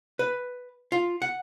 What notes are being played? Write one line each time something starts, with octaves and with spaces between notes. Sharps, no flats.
B4
F4
F#5